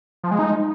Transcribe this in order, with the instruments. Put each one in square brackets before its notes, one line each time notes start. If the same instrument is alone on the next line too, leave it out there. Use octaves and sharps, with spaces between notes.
[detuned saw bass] F3
G#3
D#4